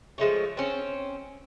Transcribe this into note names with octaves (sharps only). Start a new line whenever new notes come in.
F3 G#3 A3 C#5
C4 C#4